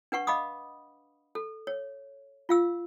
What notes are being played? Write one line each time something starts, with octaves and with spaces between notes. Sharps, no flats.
D4 B4 F#5 C#6
D#5 F5 B5 D6 D#6
A4
C#5
F4 F5 E6